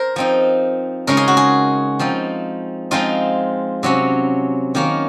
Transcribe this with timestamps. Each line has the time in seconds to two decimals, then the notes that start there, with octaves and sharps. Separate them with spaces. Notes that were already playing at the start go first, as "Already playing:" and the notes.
Already playing: A#4 C5
0.16 F3 C4 D#4
1.07 C#3 G#3 D#4 A#4
1.17 G#4
1.28 F#4
1.37 G#4
1.99 F3 C4 D#4
2.91 F3 G#3 C4 D#4 F4
3.83 C3 F#3 C#4
4.75 D#3 A#3 C#4